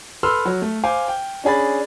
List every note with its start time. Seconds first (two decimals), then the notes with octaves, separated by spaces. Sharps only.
0.23 A4 B4 B5 C6 E6 F6
0.45 F#3
0.62 A3
0.84 C5 F5 G#5 D6
1.08 G5
1.44 C#4 D4 G#4 B5 A6